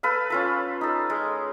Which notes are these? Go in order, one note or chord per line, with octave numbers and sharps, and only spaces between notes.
A4 B4 F5
C#4 F4 A4
D#4 A4
G#3